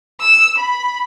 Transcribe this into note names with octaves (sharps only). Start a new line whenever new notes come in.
E6
B5